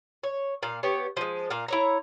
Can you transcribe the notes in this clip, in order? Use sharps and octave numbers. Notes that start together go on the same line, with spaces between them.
C#5
A#2 F5
B3 G4 C#5
F3 G#3
A#2 F5
E4 C#5 A#5